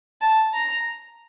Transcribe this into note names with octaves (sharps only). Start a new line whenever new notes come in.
A5
A#5